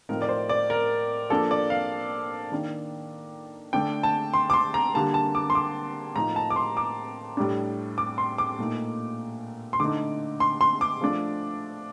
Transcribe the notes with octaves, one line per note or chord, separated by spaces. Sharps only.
A2 F3 C4 D#4 A#4
D5
C5
D5
A#4
F3 A#3 D4 A4
D5
F5
D#3 A#3 D4
D3 A3 D4 G5
A5
C6
D6
C6
A#5
D3 G3 A#3 A5
A5
D6
C6
D6
A2 F3 A#3 D#4 A#5
A5
D6
C6
D6
A2 G3 D4
D6
C6
D6
A#2 A3 D#4
C6
D3 A3 D#4 D6
C6
C6
D6
F3 A3 D4